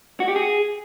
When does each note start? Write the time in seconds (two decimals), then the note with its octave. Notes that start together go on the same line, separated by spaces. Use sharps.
0.20 F#4
0.28 G4
0.36 G#4